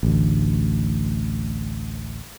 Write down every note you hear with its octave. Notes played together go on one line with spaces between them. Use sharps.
A1 D2